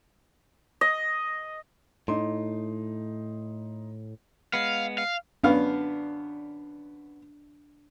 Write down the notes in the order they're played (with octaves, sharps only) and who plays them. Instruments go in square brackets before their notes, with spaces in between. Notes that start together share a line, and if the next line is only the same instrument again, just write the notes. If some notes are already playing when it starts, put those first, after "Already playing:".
[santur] D#5
[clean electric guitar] A2 [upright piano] D#4 C6
[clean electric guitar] G#3 B3 [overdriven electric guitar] F5
[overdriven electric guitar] F5
[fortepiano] F#2 B3 F5 [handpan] D4